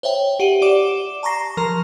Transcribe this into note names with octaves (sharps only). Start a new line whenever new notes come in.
C5 C#5 E5 G5
G4 F#5 D#7 F#7
G4 D5 D6 E7
A5 A#5 C#6 A#6 C7
F3 A#4 A#5